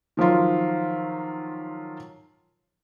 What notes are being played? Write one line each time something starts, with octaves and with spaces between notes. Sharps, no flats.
D#3 F3 F#3 F4